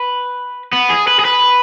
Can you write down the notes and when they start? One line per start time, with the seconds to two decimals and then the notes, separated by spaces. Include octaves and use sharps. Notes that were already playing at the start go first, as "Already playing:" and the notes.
Already playing: B4
0.73 B3
0.90 G#4
1.07 B4
1.19 G#4
1.25 B4